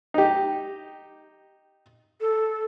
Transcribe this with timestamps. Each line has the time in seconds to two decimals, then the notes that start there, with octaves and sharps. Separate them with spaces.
0.14 D#4 G4
2.21 A4